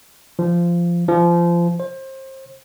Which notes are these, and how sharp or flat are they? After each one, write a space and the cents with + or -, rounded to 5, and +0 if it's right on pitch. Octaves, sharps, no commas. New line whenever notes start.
F3 -15
F3 -25
C5 +30